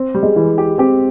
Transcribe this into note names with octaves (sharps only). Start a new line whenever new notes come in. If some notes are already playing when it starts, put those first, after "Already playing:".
Already playing: C4
G3
G#3
E3
G4
C4 G4